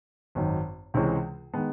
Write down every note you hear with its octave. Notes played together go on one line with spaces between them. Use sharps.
G#1 F#2 D#3
C#2 C3 E3 G#3 C#4
D#3 G#3 B3